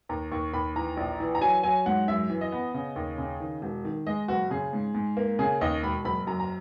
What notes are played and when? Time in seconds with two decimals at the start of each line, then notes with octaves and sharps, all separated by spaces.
0.09 D#2 A#5
0.32 D#2 C#6
0.53 D#2 B5
0.76 E3 A#5
0.97 A#1
1.20 E3
1.35 A#5
1.41 F#3 G#5
1.63 F#3 G#5
1.86 G#2 F#5
2.08 F#2 E5
2.30 E3
2.41 D#5
2.52 B3
2.74 C#3
2.96 D#2
3.18 C#3
3.40 D#3
3.62 E1
3.85 D#3
4.07 G#3 D#5
4.28 F#1 F#4
4.50 C#3 G#4
4.73 G#2
4.95 G#2
5.17 A#3
5.39 C#3 G#4
5.61 D#2 D#5
5.83 E1 B5
6.05 F#1 B5
6.27 F#2 A#5
6.40 A#5